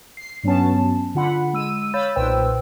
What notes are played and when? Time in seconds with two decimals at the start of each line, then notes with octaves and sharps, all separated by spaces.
0.17 C7
0.43 G2 F#3 B3 C#4 A5
1.15 D3 F4 F#5 B5
1.53 G#3 E6 D#7
1.94 C#5 F5 B5 E6 G6 A6
2.16 B1 A#2 B4 C5 G5 E6